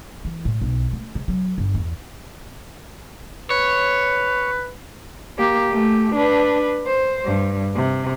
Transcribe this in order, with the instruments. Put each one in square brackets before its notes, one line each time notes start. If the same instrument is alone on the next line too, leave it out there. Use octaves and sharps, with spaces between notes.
[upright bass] E3
A2
B1
A3
C#3
F#3
G1
E2
[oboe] B4 [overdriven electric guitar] C#5
[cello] A#3 G4
A3 G4
D4 B4
C5
G2
C3